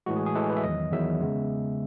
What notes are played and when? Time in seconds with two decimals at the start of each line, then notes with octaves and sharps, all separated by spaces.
0.06 A2 E3 G#3 F#4
0.16 G#4
0.26 G#4
0.35 A2 E3 G#3 A4
0.50 B4
0.57 E5
0.63 E2 D#3 F#3 D#5
0.92 E2 D#3 F#3 E5
1.21 C#3 G#3 B3